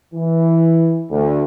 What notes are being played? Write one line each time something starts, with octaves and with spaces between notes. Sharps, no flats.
E3
D2